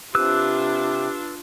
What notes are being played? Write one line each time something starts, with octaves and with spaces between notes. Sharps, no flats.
C3 D4 F4 G4 B4 E6 F#6